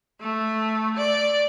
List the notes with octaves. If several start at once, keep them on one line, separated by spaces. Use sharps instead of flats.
A3
D5